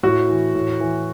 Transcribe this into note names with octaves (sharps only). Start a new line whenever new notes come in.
A2 F#4
E3
A2
E3